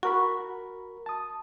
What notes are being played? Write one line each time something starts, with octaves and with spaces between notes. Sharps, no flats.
F#4 A#4 B5 C#6
A5 D#6